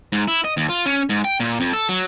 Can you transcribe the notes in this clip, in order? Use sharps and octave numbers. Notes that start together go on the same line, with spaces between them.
G#2
E4
D#5
D#2
F4
C#4
G#2
G5
A#2
F2
A4
F#3